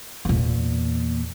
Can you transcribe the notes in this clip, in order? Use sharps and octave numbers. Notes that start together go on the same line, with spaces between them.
E2 A#2